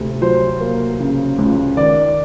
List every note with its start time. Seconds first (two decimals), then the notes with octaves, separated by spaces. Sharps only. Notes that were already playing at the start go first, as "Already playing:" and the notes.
Already playing: D2 C3
0.22 F#3 C5
0.60 A#3
0.99 C#3
1.38 C#2
1.77 D#3 D5